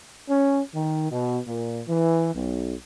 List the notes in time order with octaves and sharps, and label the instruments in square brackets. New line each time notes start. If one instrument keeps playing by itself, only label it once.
[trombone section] C#4
D#3
B2
A#2
E3
B1